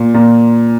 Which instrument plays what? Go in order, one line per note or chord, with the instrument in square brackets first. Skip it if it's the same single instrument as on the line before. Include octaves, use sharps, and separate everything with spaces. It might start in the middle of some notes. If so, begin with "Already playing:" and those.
Already playing: [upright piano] A#2
A#2